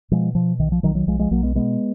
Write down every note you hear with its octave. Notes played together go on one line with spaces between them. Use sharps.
B2 F3 G#3
B2 F3
B1 D#3
F3
B1 D#3 F#3
D#3 F#3
B1 F3 G#3
F3 G#3
B1 F#3 A#3
G#3 B3
B2 G#3 B3